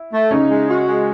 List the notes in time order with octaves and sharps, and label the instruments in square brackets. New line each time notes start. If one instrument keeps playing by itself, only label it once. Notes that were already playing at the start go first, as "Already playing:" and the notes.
Already playing: [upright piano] E4
[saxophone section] A3
[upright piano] C#3 C#4 [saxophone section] D#4
[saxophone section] G#3
F#4
G#3